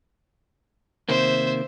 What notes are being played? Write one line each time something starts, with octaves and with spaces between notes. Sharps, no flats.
C3 D#3 A#3 C5 E5